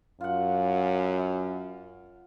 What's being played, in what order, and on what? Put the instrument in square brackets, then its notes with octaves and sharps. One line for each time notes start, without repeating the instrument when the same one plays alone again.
[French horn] F#2 [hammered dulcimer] F4 F#5